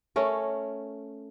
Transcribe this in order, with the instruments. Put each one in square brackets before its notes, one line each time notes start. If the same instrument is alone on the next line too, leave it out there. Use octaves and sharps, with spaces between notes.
[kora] A3 C#4 A#4